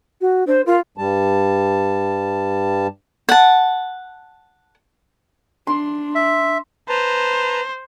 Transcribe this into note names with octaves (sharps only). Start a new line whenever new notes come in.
F#4
D4 C5
F4 A#4
G2 G3 A5
F#5 A5
D4 C6
E5
B4 C5 A5 A#5